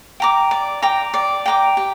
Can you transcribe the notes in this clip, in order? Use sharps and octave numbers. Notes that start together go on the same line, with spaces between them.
G5 A#5 D6
D5
G5 A#5 D6
D5
G5 A#5 D6
G4